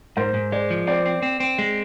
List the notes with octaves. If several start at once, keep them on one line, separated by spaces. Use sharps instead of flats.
G#2 A#4 C5
G#2
G#3 C5 D5
F3
C4 C5 D5
C4
C4
C4
G#3